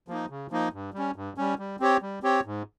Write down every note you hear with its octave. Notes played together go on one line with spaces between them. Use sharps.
F3 A#3 D#4
C#3
F3 A#3 D#4
G2
G3 C#4
G2
G3 C#4
G3
C4 G4 C#5
G3
C4 G4 C#5
G#2